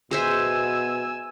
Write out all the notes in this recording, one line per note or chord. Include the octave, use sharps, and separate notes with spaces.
B2 G#4 C5 E5 G#5 E6